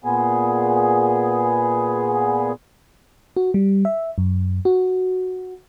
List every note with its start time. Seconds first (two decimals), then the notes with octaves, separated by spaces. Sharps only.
0.04 A#2 B3 G#4
3.37 F#4
3.54 G3
3.85 E5
4.18 F#2
4.65 F#4